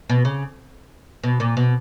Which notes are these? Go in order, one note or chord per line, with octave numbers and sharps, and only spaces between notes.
B2
C#3
B2
A#2
B2